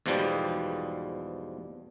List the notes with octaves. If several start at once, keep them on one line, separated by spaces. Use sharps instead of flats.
E2 G#2 B2 F3 G3